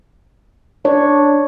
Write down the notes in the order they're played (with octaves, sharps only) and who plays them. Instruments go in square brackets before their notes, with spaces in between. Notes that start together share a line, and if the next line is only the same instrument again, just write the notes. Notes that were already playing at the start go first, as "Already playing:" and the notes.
[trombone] D4 [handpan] C#5